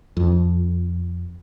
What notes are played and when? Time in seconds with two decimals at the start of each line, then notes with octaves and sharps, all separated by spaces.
0.17 F2